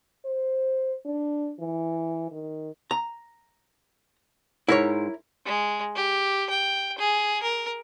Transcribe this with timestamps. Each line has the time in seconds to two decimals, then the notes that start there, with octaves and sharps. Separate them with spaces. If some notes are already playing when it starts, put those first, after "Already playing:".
0.25 C5
1.05 D4
1.60 E3
2.31 D#3
2.91 A#5
4.68 G#2 E4 A#4 C#5
5.46 G#3
5.95 G4
6.50 G5
6.98 G#4
7.43 A#4